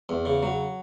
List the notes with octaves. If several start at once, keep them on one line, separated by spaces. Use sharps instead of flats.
E2
C#3
F#3